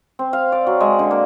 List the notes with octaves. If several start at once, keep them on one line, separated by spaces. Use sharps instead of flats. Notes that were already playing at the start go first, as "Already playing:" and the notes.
C4
F5
D5
F#3
G#3
D3
A#3